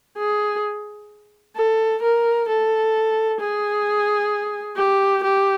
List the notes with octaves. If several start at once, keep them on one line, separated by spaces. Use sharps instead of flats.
G#4
A4
A#4
A4
G#4
G4
G4